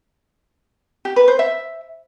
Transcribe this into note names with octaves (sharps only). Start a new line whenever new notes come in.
G4
B4
C5
E5